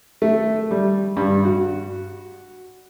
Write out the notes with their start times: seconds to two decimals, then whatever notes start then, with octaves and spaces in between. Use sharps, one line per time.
0.22 A3
0.71 G3
1.17 G2
1.45 F#4